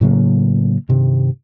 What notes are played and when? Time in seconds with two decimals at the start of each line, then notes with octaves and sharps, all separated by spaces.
0.01 A2 C#3 F#3 A#3
0.89 G2 C3 D#3